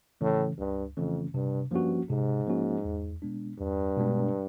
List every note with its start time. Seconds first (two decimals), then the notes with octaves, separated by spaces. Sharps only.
0.21 A2 C#3 E3 A3 C#4
0.58 C#2 G2
0.97 F2 C#3 E3 A3 C#4
1.34 G2 C3
1.71 G2 F3 A#3 C#4 F#4
2.10 G#2 C3
2.47 F3 A#3 C#4 F#4
2.85 E2
3.22 B2 G#3 B3 D4
3.59 E2 G2
3.97 B2 G#3 B3 D4